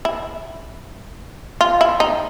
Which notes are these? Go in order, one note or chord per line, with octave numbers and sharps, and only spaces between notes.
E4
F4
E4
D#4